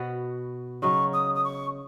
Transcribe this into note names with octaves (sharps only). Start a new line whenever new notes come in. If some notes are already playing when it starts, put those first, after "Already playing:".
Already playing: B2 B3 F#4
C#3 F#3 D#4 C#6
D#6
D#6
C#6